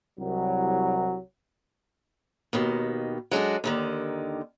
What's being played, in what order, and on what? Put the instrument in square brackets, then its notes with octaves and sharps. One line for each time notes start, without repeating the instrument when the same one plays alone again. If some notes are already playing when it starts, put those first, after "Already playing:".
[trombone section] C2 F#3
[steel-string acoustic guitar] D#2 B2 D#3
F#3 G#3 D4 A4
D#2 D3 D#3